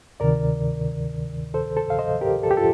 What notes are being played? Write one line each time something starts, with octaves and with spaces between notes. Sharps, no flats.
D2 C3 D#3 A#4 D5
A4 C5
A4 C5
F5
C5 D#5
G4 A#4
A4
G4
F4 A4